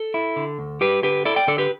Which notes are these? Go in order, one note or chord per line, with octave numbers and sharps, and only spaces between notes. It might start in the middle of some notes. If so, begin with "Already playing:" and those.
Already playing: A4
E4
D3
D2
G3 G4 B4
D3 G4 B4
E4 A4 D5
D5 G5
D3 A4 D5
G4 B4